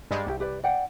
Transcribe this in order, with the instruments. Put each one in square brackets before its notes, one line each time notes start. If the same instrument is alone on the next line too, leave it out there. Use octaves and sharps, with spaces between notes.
[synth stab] G2 G3 G#3
[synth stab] C2 [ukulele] E4 G4
[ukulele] G4 B4 D5
D5 F#5 G5